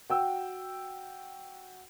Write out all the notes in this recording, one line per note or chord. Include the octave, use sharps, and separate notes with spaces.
F#4 G5 E6